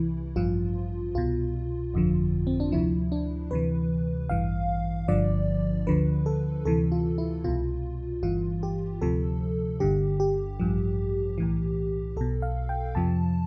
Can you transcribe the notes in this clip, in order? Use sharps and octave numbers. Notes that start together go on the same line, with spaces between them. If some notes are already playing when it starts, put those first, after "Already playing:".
Already playing: C2 C3 E3 E4
A1 G2 F3 F4
C2 B2 F4
G1 F2 D3 F3
C4
D4
D2 C3 F3 E4
D4
D2 C3 E3 B4
A1 G2 E3 F5
G1 G2 D3 F3 D5
D2 D3 F3 B4
A4
D2 C3 E3 A4
F4
E4
C2 B2 F4
G1 G2 E3 F4
G4
D2 C3 F3 A4
G1 G2 D3 G4
G4
A1 G2 F3
B1 A2 E3
B1 B2 A4
F5
G5
F2 C3 F3 A5